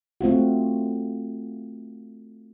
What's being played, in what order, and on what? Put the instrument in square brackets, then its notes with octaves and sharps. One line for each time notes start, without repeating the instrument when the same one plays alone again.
[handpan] A3 C4 F4 F#4